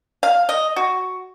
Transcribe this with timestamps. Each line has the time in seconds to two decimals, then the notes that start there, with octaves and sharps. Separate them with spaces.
0.23 F5
0.49 D#5
0.76 F#4